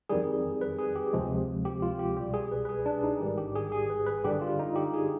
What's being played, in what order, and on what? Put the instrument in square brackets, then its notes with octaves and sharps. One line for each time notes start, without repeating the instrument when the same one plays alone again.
[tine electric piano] F2 D#3 G3 G#4
B4
G#4
G4
D2 C3 F3 G#3
G4
F4
G4
C2 B2 G3 G4
G#4
B4
B4
G#4
D4
D#4
G#1 G#2 D#3 G3 G4
G4
G#4
G#4
B4
B4
G2 D3 G3 G4
F4
D#4
G4
G#4